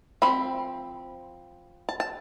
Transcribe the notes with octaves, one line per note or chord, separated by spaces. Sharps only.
F3 C4 B5
A5
A5